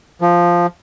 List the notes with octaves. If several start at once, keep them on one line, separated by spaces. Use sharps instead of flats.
F3